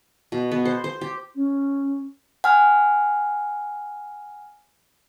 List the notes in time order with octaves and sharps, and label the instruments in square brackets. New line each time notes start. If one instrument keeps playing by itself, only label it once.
[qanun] B2
B3
C5
C5
G4
[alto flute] C#4
[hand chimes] F#5 G#5 F6